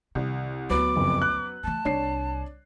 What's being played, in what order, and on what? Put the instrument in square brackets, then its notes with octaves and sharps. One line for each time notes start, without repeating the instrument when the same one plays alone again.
[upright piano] C2 [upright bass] D#3
[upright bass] D2 [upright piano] F#3 B3 B4 [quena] D6
[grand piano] F#1 F2
F#6
[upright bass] E3 A3 [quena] A5
[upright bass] C2 [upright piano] D4 [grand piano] C#5 C7